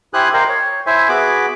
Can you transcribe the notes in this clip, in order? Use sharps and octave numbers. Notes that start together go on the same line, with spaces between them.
E4 G4 C5 G#5 D#6 F#6
A#4 C5 D#5 F5 G5 A#5
C#5
E4 C5 E5 G#5
B3 F#4 G#4 B5 D6